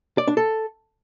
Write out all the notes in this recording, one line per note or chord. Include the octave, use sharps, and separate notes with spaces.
D5
D4
A4